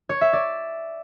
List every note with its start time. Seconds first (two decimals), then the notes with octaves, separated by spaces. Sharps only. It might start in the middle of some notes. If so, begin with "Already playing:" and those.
0.09 C#5
0.21 E5
0.33 D5